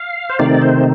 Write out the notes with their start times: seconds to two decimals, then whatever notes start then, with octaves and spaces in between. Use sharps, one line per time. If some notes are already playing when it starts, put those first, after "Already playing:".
Already playing: F5
0.30 C5
0.39 C3 D#3 A3 C4 D#4 D5
0.62 C5